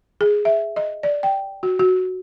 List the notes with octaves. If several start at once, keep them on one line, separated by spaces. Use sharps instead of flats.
G#4
E5
D#5
D5
G5
F#4
F#4